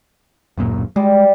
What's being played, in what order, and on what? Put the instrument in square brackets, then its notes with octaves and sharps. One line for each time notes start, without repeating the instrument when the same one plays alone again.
[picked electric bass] D1 F#2 A#2
[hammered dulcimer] G3 [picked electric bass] G#3